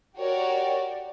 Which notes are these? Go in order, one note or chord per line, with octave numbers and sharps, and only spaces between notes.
F#4 G4 A#4 C#5 D5